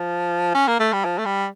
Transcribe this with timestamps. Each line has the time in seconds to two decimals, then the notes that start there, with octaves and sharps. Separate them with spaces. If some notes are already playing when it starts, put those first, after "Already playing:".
Already playing: F3
0.54 C#4
0.68 A#3
0.80 A3
0.93 G3
1.05 F3
1.18 A3
1.26 G3